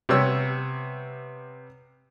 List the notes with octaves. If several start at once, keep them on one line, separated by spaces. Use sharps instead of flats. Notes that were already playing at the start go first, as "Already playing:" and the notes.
C3 G3 B3 C#5 E6